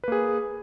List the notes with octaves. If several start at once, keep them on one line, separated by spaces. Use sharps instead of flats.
A#3 G#4 B4